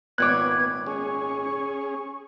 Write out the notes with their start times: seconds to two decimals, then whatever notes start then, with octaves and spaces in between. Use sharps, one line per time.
0.18 G#1 A#2 B3 C#5 D6 F#6 G#6
0.86 C#4 G#4 C#6